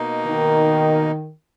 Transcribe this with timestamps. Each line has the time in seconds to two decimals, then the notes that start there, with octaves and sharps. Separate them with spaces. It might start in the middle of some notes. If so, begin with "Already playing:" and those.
Already playing: B2 A#3 D#4
0.27 D#3